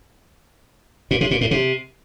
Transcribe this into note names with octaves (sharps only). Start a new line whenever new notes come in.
A#2
C3
A#2
A2
C3